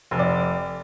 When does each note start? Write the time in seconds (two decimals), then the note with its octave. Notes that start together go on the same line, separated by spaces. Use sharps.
0.11 F1
0.19 D5